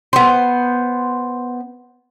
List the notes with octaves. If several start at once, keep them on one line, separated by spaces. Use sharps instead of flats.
B3 C5